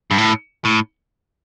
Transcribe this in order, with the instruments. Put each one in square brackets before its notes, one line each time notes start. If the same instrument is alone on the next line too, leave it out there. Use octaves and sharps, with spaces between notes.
[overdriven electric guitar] G2
A2
A2